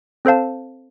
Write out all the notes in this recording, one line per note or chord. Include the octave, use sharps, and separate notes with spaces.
C4 A4 C5 F5 A5